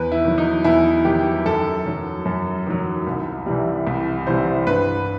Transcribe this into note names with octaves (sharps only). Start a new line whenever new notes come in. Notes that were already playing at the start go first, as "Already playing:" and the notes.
Already playing: E2 B4
E4
D#3 F#3
D#4
E2 E4
D#3 F#3 G4
F#2 A4
D#3 F#3
F#2
D#3 F#3
C2
C3 E3 G3
C2
C3 E3 G3 C5
G2 B4